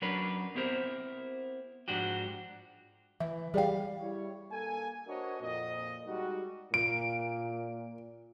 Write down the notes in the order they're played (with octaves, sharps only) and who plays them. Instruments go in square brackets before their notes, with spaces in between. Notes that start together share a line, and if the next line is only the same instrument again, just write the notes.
[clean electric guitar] F#3 C#4 D4 A#4 B4
B3 C4 E4 G4 A#4 C5
G#2 F3 D4 F#4 G4
[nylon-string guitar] E3 [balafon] E5
[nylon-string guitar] G3 F5 [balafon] G#4 D5 G5
[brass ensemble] G3 E4 C#5
G2 A#3 A4 G#5
D4 F#4 A#4 C5 C#5 D#5
F2 A#2 D#5
G3 G#3 D#4 F#4
[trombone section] A#2 [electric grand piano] D7